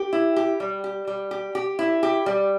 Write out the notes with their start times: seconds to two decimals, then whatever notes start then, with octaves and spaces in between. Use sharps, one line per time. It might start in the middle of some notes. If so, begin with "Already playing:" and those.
Already playing: G4
0.13 E4
0.36 G4
0.60 G3
0.84 G4
1.07 G3
1.31 G4
1.55 G4
1.79 E4
2.03 G4
2.26 G3